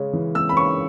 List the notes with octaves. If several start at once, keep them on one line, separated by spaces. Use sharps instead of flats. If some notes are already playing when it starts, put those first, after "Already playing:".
Already playing: C#3 G#3 C#4
E3
G#3 E6
B5
C#4 C#6